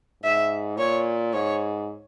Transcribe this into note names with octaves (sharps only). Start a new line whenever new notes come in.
G#2 E5
A#2 C#5
G#2 C#5